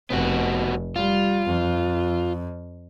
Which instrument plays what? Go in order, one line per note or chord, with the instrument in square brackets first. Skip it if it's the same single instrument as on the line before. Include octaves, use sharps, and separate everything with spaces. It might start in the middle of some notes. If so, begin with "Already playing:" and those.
[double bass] F1 [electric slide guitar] B3 C4 F#4
[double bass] G3 [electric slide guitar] F4
[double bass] F2